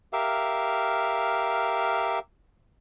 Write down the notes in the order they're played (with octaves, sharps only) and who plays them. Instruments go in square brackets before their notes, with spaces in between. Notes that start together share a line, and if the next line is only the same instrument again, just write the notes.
[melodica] G4 A#4 E5 F5